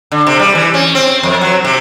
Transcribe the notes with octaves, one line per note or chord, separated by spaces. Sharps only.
D3
C3
G3
E3
C#4
C4
F2
F#3
C3